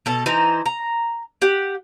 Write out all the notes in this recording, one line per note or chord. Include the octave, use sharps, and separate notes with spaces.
B2 A4
E3 D#4 C5 A#5
A#5
G4 F#5